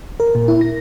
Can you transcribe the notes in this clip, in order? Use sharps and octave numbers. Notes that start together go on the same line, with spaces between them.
A#4
A#2
E4
A#6